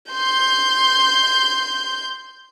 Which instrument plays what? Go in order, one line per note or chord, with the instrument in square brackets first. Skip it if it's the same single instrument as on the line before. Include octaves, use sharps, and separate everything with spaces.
[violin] C6 G6